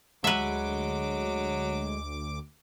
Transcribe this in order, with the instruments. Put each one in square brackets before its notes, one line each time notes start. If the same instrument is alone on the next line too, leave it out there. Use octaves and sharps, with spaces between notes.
[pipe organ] D2 D6 [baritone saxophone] F#3 [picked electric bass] G#3 [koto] B4 E5